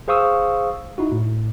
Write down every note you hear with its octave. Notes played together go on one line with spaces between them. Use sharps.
G#4 C5 F5 C#6 D#6 E6
D#4 E4 F#4
A2